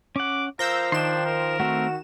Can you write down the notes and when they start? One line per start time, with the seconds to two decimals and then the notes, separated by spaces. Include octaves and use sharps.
0.16 C#4 F#5 D6
0.59 F3 A#4 F5 E6 G6 A#6
0.92 D#3 D4 G5 C6 E7
1.25 A#4
1.60 A3 C4 F#4